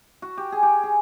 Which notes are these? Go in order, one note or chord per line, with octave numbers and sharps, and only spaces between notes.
F#4
G4
G#4
G4
G#4